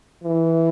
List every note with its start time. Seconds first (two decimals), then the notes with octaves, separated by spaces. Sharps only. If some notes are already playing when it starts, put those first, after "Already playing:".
0.23 E3